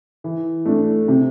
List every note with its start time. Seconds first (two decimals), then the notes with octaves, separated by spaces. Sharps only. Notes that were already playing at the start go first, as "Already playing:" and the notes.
0.24 E3
0.65 A3 D4
1.08 C3